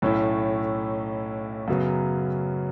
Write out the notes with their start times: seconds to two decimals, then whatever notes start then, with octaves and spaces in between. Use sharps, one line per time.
0.02 B1 A2 A3 C#4 E4
1.68 F#2 C#3 F#3 B3